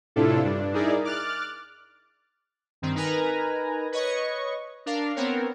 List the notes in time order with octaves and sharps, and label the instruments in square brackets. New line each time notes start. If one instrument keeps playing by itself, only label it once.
[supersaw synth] A2 C3 D4 E4 F4 A4
G2 D4
D#4 E4 G#4 A#4 D5
D6 F6 F#6 A6
[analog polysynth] G2 D#3 C4
D#4 A#4 B4 G#5 A#5
B4 C#5 D#5 C#6
D4 A#4 F5
B3 C4 A#4 C#5